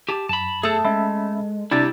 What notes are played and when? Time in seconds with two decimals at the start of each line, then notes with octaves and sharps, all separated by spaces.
0.09 G4 A5
0.29 F#2 A5 B5
0.63 A3 G#4 A4
0.85 G#3 C#4 E5 B5
1.71 C3 G3 D4 E4 G4 A6